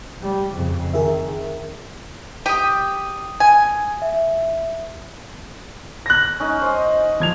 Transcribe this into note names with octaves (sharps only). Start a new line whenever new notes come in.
G3
F2 C#3
D#3 G#4 A#4 E5
G4 D#6 D#7
G#5
E5
F#6 A#6
C#4 D#4
C5 D#5
F3 G#6 F7